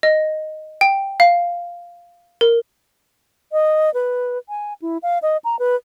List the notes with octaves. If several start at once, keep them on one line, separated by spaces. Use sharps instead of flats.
D#5
G5
F5
A#4
D#5
B4
G#5
E4
F5
D#5
A#5
B4